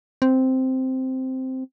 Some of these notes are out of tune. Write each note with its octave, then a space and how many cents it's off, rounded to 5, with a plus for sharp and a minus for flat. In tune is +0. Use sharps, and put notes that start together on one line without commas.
C4 -5